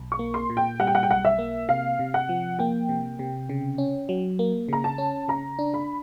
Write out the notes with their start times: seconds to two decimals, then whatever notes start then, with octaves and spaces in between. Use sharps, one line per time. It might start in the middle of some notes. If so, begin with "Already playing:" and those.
Already playing: B1
0.12 C#6
0.19 A#3
0.34 C6
0.50 A#2
0.57 G5
0.80 G3 F#5
0.87 G5
0.95 F#5
1.03 G5
1.10 B1 F#5
1.25 E5
1.39 A#3
1.69 C3 F5
1.99 C3
2.14 F#5
2.29 F3
2.59 A#3 G5
2.89 C3
3.19 C3
3.49 C#3
3.78 C#4
4.09 F#3
4.39 A#3
4.69 C#3 A#5
4.84 A5
4.98 C#4
5.28 C#3 A#5
5.59 D4
5.74 B5